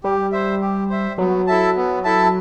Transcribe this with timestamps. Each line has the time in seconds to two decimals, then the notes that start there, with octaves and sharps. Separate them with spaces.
0.04 G3 G4
0.32 C5 E5
0.61 G4
0.90 C5 E5
1.18 F#3 B3
1.47 E4 A4 E5 A5
1.76 B3
2.04 E4 A4 E5 A5